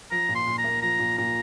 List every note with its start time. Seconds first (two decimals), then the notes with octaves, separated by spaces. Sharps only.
0.11 F3 A#5
0.29 A#2
0.35 C6
0.47 A#2
0.59 A#5
0.64 A#3
0.82 F3 A#5
0.99 A#2
1.18 A#2 A#5